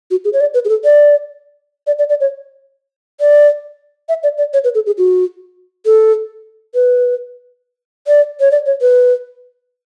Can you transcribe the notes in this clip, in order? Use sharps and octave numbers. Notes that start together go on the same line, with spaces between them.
F#4
G#4
C#5
D5
B4
G#4
A4
D5
D5
D5
D5
C#5
D5
E5
D5
D5
C#5
B4
A4
G#4
F#4
A4
B4
D5
C#5
D5
C#5
B4